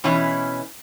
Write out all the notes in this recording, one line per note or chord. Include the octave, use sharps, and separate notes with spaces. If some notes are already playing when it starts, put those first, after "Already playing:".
B2 E3 C#4 E4